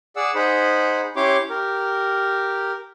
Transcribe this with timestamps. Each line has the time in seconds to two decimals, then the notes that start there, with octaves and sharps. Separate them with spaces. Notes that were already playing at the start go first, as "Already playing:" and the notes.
0.16 G#4 D5 F#5 E6
0.35 D#4 G#4 C5 F#5 B5
1.16 C#4 E4 G4 C#5 C6 D6
1.50 G4 A#4